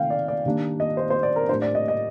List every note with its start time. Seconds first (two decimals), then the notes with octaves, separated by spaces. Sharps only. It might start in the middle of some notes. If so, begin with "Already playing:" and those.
Already playing: C3 D#3 A3 C4 F5 G5
0.10 D5
0.28 D5
0.46 D#3 G3 A#3 D4
0.80 D#5
0.97 C5
1.10 C5
1.23 D5
1.36 A#4
1.49 A2 G3 D4 C5
1.62 D5
1.75 D#5
1.88 D#5